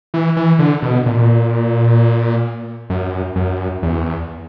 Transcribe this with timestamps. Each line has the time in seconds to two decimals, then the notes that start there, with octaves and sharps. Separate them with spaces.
0.14 E3
0.37 E3
0.59 D3
0.82 B2
1.06 A#2
2.90 F#2
3.36 F#2
3.83 E2